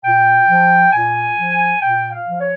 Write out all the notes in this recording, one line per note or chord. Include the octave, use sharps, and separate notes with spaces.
A#2 G5
F3
A#2 G#5
F3
A#2 G5
F5
F3
C#5